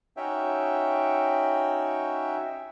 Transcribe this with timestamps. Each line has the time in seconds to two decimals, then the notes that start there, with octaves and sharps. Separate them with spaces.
0.17 C#4 D#4 F#4 C#5 E5 G5